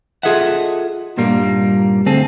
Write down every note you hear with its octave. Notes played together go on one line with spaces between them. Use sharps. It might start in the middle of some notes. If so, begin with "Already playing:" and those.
F4 G#4 A4 D#5 E5 F#5
G2 A#2 G3 A#3
D2 C4 G#4 A4